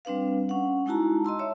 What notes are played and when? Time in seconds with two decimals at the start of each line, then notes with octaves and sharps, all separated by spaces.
0.05 G3 C4 D4 B4 F5
0.49 C#4 F#5
0.86 G#3 D#4 E4 F#4 A5 A#5
1.25 D#5 A5 C6 E6
1.39 C#5 E5